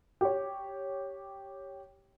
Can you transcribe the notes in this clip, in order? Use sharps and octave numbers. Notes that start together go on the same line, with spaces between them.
G4 C#5